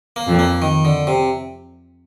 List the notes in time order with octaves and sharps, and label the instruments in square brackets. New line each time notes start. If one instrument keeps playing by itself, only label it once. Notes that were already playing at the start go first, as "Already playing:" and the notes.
[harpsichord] A#3
[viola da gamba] F2
[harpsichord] A#3
D#3
D3
C3